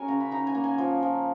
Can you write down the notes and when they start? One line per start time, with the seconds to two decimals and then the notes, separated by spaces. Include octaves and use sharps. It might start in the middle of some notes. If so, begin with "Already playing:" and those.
Already playing: G#3 C#4 F#4 A#4 C#5 G#5
0.08 C#3 A#5
0.20 B5
0.31 D#4 A#5
0.47 G#5
0.55 A#3
0.64 G#5
0.78 F3
1.03 F3